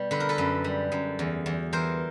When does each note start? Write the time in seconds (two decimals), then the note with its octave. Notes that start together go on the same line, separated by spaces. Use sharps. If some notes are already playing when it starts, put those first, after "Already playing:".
Already playing: B2 G3
0.11 D3 B4
0.20 A#4
0.29 A4 B4
0.38 F#2
0.64 G3
0.92 F#2
1.19 E2
1.46 E2
1.73 E3 A#4 C5